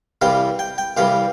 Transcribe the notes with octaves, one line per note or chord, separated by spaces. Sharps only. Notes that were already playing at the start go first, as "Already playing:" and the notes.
C2 C3 E3 G3 F5
G5
G5
C2 C3 E3 G3 F5